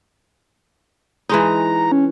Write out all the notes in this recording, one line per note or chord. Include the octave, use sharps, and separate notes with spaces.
E3 G#3 D#4 A#5
C#4